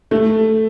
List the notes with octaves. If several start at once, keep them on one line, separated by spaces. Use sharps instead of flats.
A3